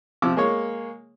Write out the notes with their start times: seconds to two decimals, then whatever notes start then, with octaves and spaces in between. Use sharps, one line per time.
0.22 C3 F3 D6 E6
0.37 G#3 A#3 C#5